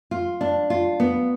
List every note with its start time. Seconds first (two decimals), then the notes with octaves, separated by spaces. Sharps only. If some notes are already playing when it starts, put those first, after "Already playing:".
0.11 F4
0.41 D4
0.70 F4
1.00 B3